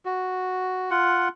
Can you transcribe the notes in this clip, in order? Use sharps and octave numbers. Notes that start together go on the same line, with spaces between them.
F#4
F4 F#5